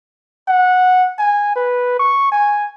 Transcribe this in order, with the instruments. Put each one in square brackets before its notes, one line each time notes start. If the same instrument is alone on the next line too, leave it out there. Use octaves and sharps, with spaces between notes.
[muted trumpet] F#5
G#5
B4
C#6
G#5